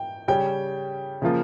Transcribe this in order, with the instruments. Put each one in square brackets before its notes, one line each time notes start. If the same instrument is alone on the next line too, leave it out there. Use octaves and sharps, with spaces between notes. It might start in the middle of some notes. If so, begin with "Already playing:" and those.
Already playing: [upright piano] G5
C#3 G3 C#4 G5
C#3 F3 A#3 F4